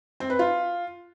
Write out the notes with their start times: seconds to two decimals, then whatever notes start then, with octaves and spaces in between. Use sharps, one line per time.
0.20 C4
0.30 B4
0.39 F4